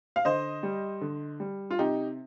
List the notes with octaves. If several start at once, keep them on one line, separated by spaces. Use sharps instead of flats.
F5
D3 C5 D#5
G3
D3
G3
F4
C3 D#4 G4